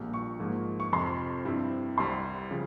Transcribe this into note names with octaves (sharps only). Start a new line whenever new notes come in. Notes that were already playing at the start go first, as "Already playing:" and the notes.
Already playing: A#1 A#2 G3
C#6
G#2 F3 A#3
C#6
F2 C3 F3 C6
G2 G3 C4 E4
C2 C3 G3 C4 C6
C#3 F3